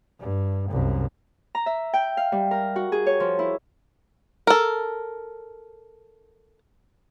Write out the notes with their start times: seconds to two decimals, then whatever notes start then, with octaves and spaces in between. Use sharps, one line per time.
0.21 G2
0.70 C2 F#2
1.55 A#5
1.66 E5
1.94 G5
2.17 F5
2.32 G3
2.51 A#4
2.76 F#4
2.92 G#4
3.06 C#5
3.20 F3
3.39 E4
4.47 A4 A#4